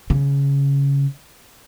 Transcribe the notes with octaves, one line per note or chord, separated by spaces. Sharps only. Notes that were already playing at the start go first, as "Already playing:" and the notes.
C#3